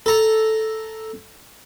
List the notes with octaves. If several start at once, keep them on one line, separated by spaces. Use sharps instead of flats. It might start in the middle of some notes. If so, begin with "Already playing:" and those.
A4 A#5